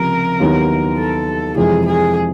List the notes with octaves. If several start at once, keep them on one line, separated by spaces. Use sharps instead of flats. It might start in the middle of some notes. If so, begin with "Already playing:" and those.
Already playing: C#2 C3 F3 A#4
D#2 D#3 F#3 B3 E4
A4
F2 C3 E3 G#3 G#4
G#4